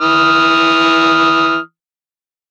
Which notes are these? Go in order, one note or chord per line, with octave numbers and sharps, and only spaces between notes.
E3 D#6 F6